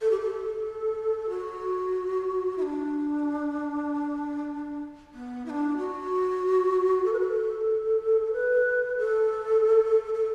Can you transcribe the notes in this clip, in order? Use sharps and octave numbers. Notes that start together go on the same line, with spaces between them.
A4
G4
A4
F#4
E4
D4
B3
E4
D4
F#4
A4
B4
A4
B4
A4
A4